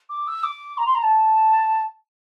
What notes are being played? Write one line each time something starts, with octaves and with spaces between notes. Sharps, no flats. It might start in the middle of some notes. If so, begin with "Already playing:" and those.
D6
E6
D6
A#5
C6
A#5
A5